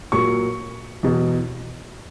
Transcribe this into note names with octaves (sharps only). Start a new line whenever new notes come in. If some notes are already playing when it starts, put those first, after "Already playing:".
A#2 F#3 C#6
E2 B2 F#3